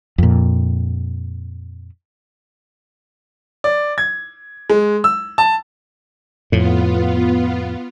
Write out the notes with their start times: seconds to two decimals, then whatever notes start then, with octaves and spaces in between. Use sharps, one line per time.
0.18 F2 A#2
3.64 D5
3.98 G#6
4.70 G#3
5.04 E6
5.38 A5
6.52 F2 A2 B3 F4